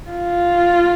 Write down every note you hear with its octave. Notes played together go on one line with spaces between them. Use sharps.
F4